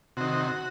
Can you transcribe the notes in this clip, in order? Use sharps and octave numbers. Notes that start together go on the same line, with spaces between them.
C3 D#3 F#4